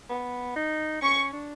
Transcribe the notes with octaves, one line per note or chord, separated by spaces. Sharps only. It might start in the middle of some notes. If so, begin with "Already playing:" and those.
B3
D#4
C#4 C#6
D4